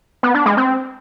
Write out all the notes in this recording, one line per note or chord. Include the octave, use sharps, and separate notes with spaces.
B3
D4
G#3
C4